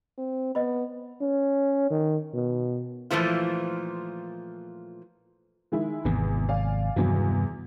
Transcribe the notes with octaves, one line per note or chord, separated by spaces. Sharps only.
C4
B3 D#5 B5
C#4
D#3
B2
A#2 E3 F3 A3 F4
D#3 G#3 E4
G#1 E2 C3
D5 F5 G#5
E2 G2 C3 D#3 F#3